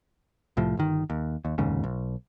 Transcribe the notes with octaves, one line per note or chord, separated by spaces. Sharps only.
C2 A2 F3
G1 D#3
D#2
D#2
F1 D#2 G#2 C#3
B1